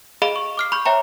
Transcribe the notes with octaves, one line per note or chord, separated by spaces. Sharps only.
G#4 D#5 F5 B5 D7 G7
C#6
D6 F6 C7
B5 C#6 G6
C#5 E5 G5 A#5